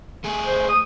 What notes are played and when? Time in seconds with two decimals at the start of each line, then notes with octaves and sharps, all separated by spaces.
0.24 A3 G#4
0.46 C5
0.69 D#6